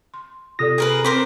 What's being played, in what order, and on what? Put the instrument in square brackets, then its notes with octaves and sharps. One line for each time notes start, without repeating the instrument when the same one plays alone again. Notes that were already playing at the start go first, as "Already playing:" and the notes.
[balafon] C6
[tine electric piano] C3 D#6 A#6 [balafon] F4 A4 D5
[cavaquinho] G#4 A#4 B4
[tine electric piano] C4 B6 [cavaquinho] A#4 C5 D6